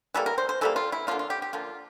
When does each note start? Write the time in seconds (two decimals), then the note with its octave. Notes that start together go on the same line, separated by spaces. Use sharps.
0.14 E3 G3 A#3 A4
0.26 A#4
0.38 C5
0.49 C5
0.61 E3 G3 A#3 A4
0.76 F4
0.92 E4
1.07 D3 F3 A#3 F4
1.19 F4
1.30 G4
1.42 G4
1.53 D3 F3 A#3 F4